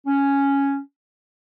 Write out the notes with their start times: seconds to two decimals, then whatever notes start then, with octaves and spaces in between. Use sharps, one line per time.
0.07 C#4